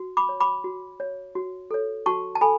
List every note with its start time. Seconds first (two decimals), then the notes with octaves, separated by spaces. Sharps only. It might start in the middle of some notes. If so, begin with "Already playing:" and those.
Already playing: F#4
0.17 B5 D6
0.29 C#5
0.40 B5 D6
0.64 F#4
1.00 C#5
1.35 F#4
1.71 A4 C#5
2.06 F#4 A5 C#6
2.35 A5
2.41 A4 G#5 B5